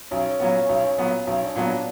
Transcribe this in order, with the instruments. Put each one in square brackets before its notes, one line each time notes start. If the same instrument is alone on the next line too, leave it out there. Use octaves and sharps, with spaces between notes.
[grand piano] B1 [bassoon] C#4
[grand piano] A#2 F#3 B3
B1
A#2 F#3 B3
[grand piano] B1 [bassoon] C#4
[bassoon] D4
[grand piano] A#2 F#3 B3
[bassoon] D4